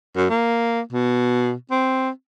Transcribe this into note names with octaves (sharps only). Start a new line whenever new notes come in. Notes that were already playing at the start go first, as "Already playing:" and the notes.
F#2
A#3
B2
C4